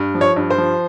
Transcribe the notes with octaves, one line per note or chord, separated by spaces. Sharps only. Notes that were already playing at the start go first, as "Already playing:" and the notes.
Already playing: G2
F3
C#5
G2
C5
F3